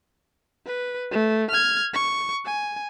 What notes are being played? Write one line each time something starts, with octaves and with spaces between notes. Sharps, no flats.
B4
A3
F6 G#6
C#6
G#5